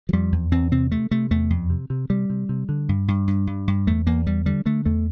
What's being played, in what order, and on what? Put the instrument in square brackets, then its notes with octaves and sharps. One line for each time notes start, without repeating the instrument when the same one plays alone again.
[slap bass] F3
F2 G3
E2
E2 C4
C3 C4
C3 A3
C3 A3
E2 A3
F2
C3
C3
C3 G3
C3
C3
D3
G2
G2
G2
G2
G2
E2 A3
E2 A#3
E2 G3
D3 G3
D3 A3
E2 A3